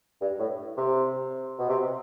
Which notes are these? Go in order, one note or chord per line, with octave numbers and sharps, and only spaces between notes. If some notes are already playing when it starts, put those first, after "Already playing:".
G2
A2
C3
B2
C3